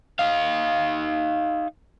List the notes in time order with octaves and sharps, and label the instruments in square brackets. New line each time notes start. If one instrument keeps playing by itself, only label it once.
[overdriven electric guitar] D#4 F5